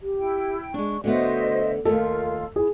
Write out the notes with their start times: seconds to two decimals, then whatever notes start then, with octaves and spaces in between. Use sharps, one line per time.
0.01 G4
0.16 E4 G5
0.74 G#3 D4 C#6
1.04 D3 A3 B3 F#4 C5 D#5 E5
1.85 D#2 A3 F4 A4 A#4
2.56 E4 G#4